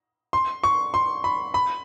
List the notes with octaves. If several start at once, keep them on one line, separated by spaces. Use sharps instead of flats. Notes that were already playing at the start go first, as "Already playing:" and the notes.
C6
C#6
C6
B5
B5